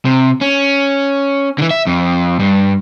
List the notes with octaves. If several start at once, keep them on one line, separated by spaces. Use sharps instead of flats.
C3
C#4
D3 E3
E5
F2
G2